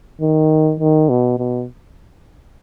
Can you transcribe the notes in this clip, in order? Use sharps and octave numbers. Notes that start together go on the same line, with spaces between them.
D#3
D#3
B2
B2